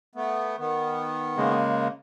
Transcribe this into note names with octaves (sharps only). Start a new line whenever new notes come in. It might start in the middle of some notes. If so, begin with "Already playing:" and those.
A3 B3
D#3 B3
C#3 G#3 A#3